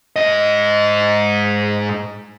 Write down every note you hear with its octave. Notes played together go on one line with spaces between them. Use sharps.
G#2 D#5